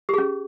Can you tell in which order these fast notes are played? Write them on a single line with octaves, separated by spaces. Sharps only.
G4 G#4 C#4